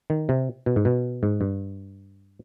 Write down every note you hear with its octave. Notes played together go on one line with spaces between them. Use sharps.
D#3
C3
B2
G#2
B2
G#2
G2